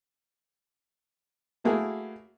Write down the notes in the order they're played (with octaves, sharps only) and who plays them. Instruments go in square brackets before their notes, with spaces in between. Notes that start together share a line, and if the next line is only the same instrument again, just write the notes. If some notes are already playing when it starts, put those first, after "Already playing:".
[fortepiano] F#3 A3 A#3 E4 F#4 G#4